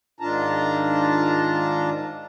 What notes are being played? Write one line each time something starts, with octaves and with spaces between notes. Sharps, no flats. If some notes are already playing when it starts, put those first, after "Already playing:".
G#2 D#3 D4 F4 A5 A#5